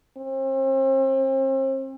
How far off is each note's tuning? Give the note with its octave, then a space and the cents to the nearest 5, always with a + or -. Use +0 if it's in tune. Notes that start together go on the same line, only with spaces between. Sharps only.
C4 +40